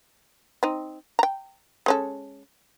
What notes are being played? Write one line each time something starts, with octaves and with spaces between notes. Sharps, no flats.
C4 D#4
G5 A#5
G#3 C#4 A4